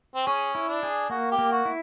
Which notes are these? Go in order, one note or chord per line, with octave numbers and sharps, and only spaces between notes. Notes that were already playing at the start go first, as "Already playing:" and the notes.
C4
C#4 G#4
E4
D4
G#4
A#3 F#4
G4
A#3
F#4
E4